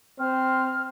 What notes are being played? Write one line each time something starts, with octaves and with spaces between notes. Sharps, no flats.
C4 C5 F6